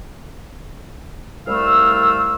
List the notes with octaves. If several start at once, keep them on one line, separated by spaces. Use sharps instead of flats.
C2 G3 A3 F5 E6